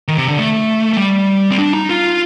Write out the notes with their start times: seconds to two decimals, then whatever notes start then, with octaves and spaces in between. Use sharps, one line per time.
0.08 D#3
0.18 C3
0.28 D3
0.38 A3
0.93 A3
0.98 G3
1.51 C4
1.58 D4
1.74 D#4
1.89 F4